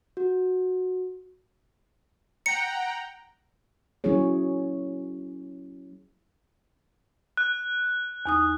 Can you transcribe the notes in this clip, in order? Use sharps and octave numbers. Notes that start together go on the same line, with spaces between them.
F#4
F#5 G5 A#5 C#7
F#3 A#3 C#4 E4 G#4 C#5
F#6
E2 D#4 D#6